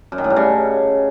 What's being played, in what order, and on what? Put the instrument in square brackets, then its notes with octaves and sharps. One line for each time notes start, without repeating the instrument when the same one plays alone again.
[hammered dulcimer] F#2
D#3
A2
G2
C#3